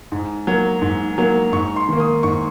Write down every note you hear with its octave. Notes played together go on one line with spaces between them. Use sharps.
G#2
F#3 A#3
G#2
F#3 A#3
G#2 C#6
C6
D#3 A#3
D#6
G#2 C#6